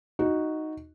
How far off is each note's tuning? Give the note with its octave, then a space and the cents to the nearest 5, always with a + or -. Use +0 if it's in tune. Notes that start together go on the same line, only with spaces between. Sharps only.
D#4 +0 F#4 +0